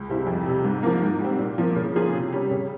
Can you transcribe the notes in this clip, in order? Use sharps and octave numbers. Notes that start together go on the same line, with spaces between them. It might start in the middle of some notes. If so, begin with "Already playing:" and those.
Already playing: C#2
C3 G3 C4 E4
F2
C3 G3
G#2
F3 A#3
G#2
G3 C4
A#2
F3 A#3
C#3
F3 A#3 F4 G#4
C3
G3 C#4
C#3